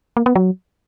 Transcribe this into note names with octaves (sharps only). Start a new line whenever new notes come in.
A#3
B3
F#3